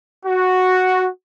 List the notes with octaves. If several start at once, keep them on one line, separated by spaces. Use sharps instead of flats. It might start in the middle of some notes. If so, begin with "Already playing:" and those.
F#4